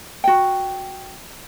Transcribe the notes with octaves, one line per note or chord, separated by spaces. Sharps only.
F#4 G5